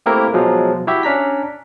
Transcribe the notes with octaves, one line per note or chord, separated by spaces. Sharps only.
A3 A#3 C4 E4 G4 A#4
B2 F3 F#3 G#3
E4 F#4 G4 E5
C#4 D4 A#5 B6